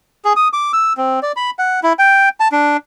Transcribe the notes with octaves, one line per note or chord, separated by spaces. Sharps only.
G#4
D#6
D6
E6
C4
D5
B5
F#5
E4
G5
A5
D4